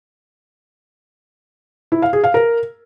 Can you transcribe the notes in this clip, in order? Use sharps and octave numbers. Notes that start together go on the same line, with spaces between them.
E4
F5
G#4
F5
A#4